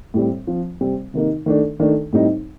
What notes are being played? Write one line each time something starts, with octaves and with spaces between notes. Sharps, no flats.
A2 G3 C4
F3 C4 F4
C3 G3 C4
C3 D#3 A#3 D#4
D#3 A3 D4
D#3 A3 D4
A2 G3 C4 D#4